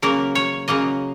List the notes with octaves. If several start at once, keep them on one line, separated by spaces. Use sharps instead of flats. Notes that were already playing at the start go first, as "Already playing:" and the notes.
C#3 F#3 A#3 A#4
C#5
C#3 F#3 A#3 D#5